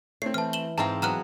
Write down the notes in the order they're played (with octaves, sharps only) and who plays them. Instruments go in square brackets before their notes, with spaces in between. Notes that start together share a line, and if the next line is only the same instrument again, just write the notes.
[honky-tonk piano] A3 C4 [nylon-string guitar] C#5 [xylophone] C7
[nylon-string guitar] E3 [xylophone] A5 F6
[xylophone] E7 F#7 G7
[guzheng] G#2 C4 F5 [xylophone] E5 A#5 [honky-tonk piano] A5
[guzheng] F#3 B3 [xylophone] A#5 F6 F#6